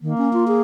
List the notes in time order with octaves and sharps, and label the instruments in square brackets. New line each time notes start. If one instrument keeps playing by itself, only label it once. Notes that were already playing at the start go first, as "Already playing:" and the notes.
[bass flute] D#3 [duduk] A#3
[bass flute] C#4
F4
G#4